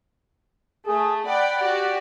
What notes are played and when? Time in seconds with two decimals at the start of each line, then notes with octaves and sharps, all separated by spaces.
0.87 A3 G#4
1.26 D5 F#5 G5 B5
1.60 F#4 G4 D5